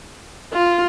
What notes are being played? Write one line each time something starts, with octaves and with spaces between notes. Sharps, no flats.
F4